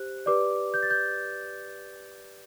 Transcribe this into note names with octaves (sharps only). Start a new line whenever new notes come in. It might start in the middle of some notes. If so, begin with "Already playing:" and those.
Already playing: G4 C5 F#6
G4 B4 D5 D6
G6
A6
G6